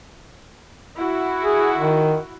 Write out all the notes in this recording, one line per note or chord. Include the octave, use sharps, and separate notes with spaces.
E4 F#4
G#4
D#3